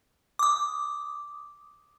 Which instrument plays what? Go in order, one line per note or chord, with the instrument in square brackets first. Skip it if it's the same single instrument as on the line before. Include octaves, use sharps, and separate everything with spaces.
[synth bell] D6 D#6